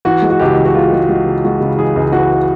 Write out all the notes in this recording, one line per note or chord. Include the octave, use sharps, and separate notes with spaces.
E3 F#4
G#3
F#4
C#2 G4
E3 G4
F#4
G#3 F4
G#3
G#3 F#4
C#3
G#3 F#4
C#3
E3 G#4
C#2
E3 F#4